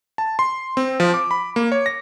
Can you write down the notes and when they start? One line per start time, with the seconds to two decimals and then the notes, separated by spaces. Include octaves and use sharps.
0.18 A5
0.39 C6
0.77 C4
1.00 F3
1.14 D6
1.31 B5
1.56 A#3
1.72 C#5
1.86 A#6